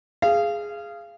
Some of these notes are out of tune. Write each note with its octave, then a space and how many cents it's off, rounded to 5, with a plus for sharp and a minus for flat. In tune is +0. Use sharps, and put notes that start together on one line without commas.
G#4 +0 F5 -20